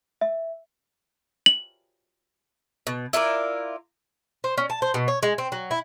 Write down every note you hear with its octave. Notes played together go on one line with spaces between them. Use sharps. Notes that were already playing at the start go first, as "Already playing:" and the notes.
E5
F#7
B2
E4 F4 A#4 D5
C5
C#4
A5
C5
B2
C#5
G#3
C4
F#3
E4